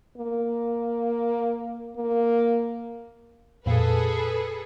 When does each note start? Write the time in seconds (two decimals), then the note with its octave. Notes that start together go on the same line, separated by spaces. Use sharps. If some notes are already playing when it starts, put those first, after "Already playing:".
0.18 A#3
1.97 A#3
3.66 F2 A#2 G#4 A4 B4